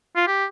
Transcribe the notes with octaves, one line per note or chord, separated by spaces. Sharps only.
F4
G4